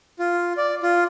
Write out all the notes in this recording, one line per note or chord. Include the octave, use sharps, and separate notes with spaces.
F4
D5
F4